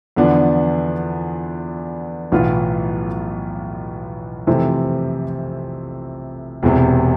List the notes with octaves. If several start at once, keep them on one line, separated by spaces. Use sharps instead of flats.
E2 D3 F3 B3 D4
B1 A2 E3 B3 F4
F2 C3 E3 A3 C4
E1 E2 C3